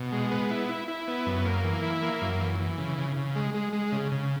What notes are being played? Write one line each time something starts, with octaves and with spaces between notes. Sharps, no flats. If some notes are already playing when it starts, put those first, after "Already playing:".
Already playing: B2
G#3
B3
E4
E4
E4
B3
F#2
A#3
E3
E4
A#3
F#2
E3
E3
C#3
C#3
C#3
G#3
G#3
G#3
C#3
C#3